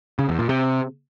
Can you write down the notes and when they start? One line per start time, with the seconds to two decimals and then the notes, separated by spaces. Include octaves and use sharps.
0.19 C#3
0.29 E2
0.39 A#2
0.49 C3